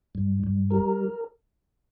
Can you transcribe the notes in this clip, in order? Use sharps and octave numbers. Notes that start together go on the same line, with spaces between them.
G2
G2
G3 A#4